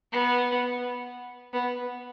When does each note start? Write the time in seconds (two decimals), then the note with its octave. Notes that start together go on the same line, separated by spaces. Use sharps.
0.12 B3
1.53 B3